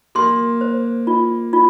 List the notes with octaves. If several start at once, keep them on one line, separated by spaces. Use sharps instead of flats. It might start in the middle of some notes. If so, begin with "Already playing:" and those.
A#3 C6
C5
F4
F4